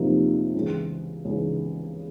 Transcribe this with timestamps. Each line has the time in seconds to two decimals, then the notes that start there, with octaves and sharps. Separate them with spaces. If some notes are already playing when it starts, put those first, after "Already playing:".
Already playing: F2 C3 F3 A#3 D#4
0.54 C#2 C#3 E3
1.25 C#2 C#3 E3